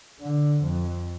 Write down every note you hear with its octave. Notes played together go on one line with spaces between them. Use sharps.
D3
F2